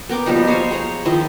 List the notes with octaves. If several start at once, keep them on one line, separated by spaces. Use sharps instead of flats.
B3 A#4 G5 D6
B2 F3 G3 D#4
C5 C#5 F5 G#5
G#4 C#5 A#5
D#3 F3 E4 D#5